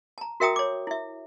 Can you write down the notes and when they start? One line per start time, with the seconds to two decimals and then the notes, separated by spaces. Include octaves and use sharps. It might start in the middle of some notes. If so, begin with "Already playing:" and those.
0.18 A5 A#5
0.40 F#4 A#4 E5 G5 A#5 D#6
0.56 C#5 D6
0.87 E4 E5